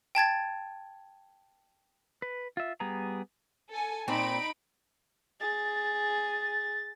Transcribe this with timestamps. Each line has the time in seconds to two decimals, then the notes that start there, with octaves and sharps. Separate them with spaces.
0.15 G5 A5 G#6 A6
2.22 B4
2.57 F4 E5
2.80 G3 B3 G#4 A#5
3.70 A4 G#5
4.08 A#2 C4 D#4 B5 D7
5.41 G#4 A6